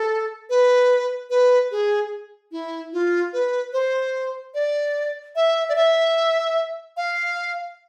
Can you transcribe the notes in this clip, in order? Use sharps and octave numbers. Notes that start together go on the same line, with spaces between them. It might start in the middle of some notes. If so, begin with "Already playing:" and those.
Already playing: A4
B4
B4
G#4
E4
F4
B4
C5
D5
E5
D5
E5
F5